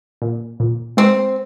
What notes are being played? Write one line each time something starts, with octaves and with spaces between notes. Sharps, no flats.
A#2
A#2
G#3 C4